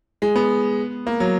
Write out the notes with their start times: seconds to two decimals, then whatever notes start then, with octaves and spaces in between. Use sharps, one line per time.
0.22 G#3
0.36 B3
1.07 A#3
1.20 F#3